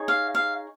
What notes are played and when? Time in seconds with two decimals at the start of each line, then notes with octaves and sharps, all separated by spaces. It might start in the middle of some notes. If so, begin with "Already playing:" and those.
Already playing: D#4 G#4 C#5
0.08 F5
0.35 F5